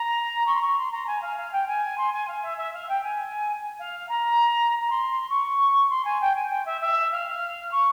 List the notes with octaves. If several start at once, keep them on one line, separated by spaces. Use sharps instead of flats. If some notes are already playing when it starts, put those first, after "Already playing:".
Already playing: A#5
C#6
C6
C#6
C6
A#5
G#5
F5
F5
G5
G#5
C6
G#5
F5
E5
E5
F5
G5
G#5
F5
A#5
A#5
C6
C#6
C6
G#5
G5
G#5
G5
E5
E5
F5
C#6